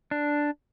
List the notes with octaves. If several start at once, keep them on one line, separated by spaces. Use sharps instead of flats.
D4